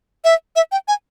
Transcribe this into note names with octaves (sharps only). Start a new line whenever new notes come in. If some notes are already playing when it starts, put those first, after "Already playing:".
E5
E5
G5
G#5